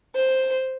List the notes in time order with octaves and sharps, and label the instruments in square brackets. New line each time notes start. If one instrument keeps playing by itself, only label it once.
[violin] C5